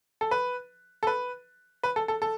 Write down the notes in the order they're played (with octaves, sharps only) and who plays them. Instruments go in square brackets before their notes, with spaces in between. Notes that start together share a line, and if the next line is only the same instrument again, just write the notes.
[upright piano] A4
B4
A4
B4
B4
A4
A4
A4